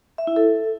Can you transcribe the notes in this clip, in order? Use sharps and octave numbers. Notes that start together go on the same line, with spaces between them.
E5
E4
A4